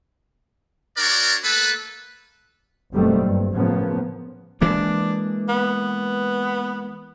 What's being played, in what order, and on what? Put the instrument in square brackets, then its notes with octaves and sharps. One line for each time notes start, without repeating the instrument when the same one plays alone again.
[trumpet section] D4 F#4 A#4 C#5 D5
A3 A#3 A4 B4
[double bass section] F#1 B2 D#3 G3 A3 C4
G2
A2 C#3 F3 A#3 B3
[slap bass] E3 G#3 A#3 [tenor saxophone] D4
[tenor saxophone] B3